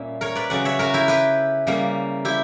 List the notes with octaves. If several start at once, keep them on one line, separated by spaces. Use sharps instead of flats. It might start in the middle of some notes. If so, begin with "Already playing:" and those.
Already playing: A#2 G3 A#3 C#4 E5
A#4 C#5
B4 D5
C#3 F#3 C#4 D5 F#5
C#5 E5
F#4 A#4
E4 G4
G4 B4
C#3 G3 A#3
E4 G4